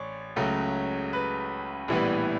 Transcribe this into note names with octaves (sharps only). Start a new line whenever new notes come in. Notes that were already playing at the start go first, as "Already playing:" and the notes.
Already playing: A1 C#5 D5
C#2 C#3 F#3 A3
B4
A#1 A2 E3 G3 B3